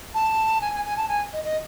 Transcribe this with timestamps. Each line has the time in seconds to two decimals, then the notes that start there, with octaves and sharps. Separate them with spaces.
0.14 A5
0.61 G#5
0.74 G#5
0.85 G#5
0.97 A5
1.08 G#5
1.33 D#5
1.44 D#5